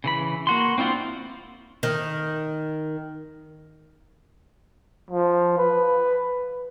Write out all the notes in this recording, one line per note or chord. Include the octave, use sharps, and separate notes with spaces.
C#3 E3 B5
A#3 F#4 C6
C4 D4 E4 F4 C5
D#3
F3
B4